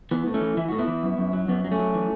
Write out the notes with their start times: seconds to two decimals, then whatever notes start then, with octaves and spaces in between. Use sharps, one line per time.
0.11 E3 B3
0.27 A2
0.34 A3 C#4
0.41 E3
0.57 E3 E4
0.68 A2 F#4
0.79 B3 E4
0.88 E3
1.03 F#2
1.18 F#2
1.33 F#3
1.48 F#2 B3
1.64 F#3
1.71 A3 C#4
1.79 F#3
1.95 E3